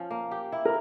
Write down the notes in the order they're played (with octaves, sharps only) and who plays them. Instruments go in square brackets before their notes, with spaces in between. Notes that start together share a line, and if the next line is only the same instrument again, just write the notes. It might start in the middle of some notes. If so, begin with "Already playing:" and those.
Already playing: [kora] F3 C#4 F4
A#3
G4
E4
[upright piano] A#4